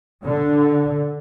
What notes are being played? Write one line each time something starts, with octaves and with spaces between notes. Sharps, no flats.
D3